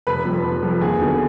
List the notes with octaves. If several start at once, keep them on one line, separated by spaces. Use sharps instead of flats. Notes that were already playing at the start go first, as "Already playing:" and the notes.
F1 B4 B5
F2 F3
F1
F2 F3
D#2 G#4 G#5
D3 F#3 B3